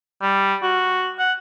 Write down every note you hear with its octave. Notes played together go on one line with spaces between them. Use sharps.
G3
F#4
F#5